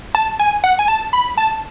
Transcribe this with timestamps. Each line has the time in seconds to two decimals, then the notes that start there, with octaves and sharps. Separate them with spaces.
0.15 A5
0.39 G#5
0.64 F#5
0.79 G#5
0.88 A5
1.13 B5
1.37 A5